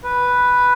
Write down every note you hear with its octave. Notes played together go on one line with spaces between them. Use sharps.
B4